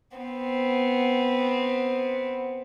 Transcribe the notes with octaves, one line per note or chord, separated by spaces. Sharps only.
B3 C4